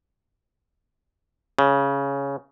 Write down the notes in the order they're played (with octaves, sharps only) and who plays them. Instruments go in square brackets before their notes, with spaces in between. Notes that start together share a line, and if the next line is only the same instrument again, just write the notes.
[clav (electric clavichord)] C#3